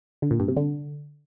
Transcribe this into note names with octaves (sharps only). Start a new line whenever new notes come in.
D3
A#2
G2
C3
D3